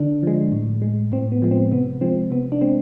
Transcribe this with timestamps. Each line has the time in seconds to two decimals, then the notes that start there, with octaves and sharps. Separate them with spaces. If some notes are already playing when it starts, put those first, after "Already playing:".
Already playing: D3 D4
0.23 F3 G#3
0.52 A2
0.82 G#3
1.12 A2 C4
1.32 B3
1.42 F3 G#3
1.51 C4
1.72 C3 B3
2.01 F3 G#3 C4
2.31 C3 B3
2.52 D4
2.61 G#3 C4